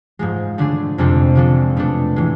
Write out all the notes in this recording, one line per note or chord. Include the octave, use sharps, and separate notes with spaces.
G#2 F3 G#3
D3 A3 D4 G#4
F2 C3 G#3 D4 A4
D3 F3 G#3 D4 A4
B2 A3 D4 A4
A2 E3 G#3